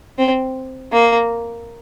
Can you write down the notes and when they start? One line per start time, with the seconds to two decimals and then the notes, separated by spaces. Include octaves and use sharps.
0.18 C4
0.92 A#3